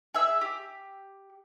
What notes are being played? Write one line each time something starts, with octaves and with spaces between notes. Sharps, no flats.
G#4 E5 E6
G4